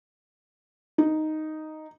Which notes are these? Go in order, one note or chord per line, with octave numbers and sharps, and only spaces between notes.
D#4